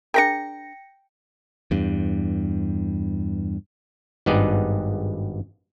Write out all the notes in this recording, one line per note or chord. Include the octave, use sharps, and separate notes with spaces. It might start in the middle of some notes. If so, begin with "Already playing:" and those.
D4 G#4 A#4 G5 A#6 C#7
E2 G2
G#1 G2 B3 D#4 G#4 D5